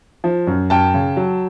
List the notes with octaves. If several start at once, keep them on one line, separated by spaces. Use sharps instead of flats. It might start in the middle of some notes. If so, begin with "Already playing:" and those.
F3
F#2
F#2 G5 A5
C#3
F#3